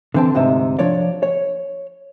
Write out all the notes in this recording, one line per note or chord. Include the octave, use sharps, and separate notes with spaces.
D3 E3 C4 G5 A5
D2 G#2 C3 D#4 E5
F3 D4 C#5 D5
C#5